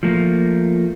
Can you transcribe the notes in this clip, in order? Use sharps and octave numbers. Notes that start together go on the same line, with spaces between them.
F3 A3 A#3